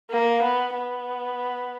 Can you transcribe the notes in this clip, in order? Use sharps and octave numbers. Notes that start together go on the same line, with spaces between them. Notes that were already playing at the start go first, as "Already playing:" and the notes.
A#3
B3
B3